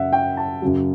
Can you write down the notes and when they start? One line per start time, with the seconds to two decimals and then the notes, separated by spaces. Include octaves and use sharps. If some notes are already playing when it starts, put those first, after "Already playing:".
Already playing: F#2 C#3 E5 F#5
0.13 G5
0.37 A5
0.62 F#2 C#3 F#3